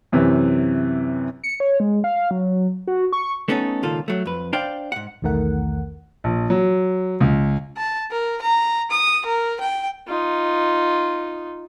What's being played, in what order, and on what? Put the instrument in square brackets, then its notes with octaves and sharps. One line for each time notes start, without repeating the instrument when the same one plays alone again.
[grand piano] F#2 C3 E3
[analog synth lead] C#7
C#5
G#3
F5
F#3
F#4
C#6
[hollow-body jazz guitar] A3 B3 C#4 D#4 A4
C#2 A#2 D#3 F4 A4
F#3 A3
F2 B4
D4 C5 D5 F5 G5
G#2 F#5
[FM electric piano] B1 E2 D#3 A3 A#4 F#5
[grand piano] A#1
F#3
C#2
[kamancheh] A5
A#4
A#5
D#6
A#4
G5
[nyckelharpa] D#4 F4